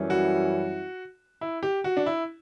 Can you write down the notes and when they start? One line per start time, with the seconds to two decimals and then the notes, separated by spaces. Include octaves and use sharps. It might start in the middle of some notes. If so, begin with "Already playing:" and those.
Already playing: F#2 E3 G3 C#4 E4
0.10 F#4
1.41 E4
1.63 G4
1.84 F#4
1.97 D4
2.06 E4